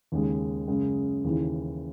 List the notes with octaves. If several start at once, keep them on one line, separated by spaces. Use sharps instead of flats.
D#2 C#3 G#3
F#2 C#3 G#3
D#2 C#3 E3